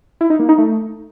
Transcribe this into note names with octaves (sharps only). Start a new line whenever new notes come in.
E4
D#4
A#3
D#4
A3